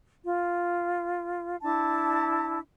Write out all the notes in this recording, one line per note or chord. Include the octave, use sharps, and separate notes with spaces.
F4
D4 E4 A5